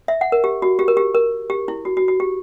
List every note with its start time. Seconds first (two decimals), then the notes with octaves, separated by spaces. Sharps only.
0.08 E5
0.21 F#5
0.32 A#4
0.44 G4
0.62 F#4
0.79 G4
0.88 A#4
0.97 G4
1.15 A#4
1.50 G4
1.68 E4
1.85 F#4
1.97 F#4
2.08 F#4
2.20 G4